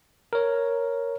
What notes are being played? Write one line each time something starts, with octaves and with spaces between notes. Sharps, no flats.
A#4 C#5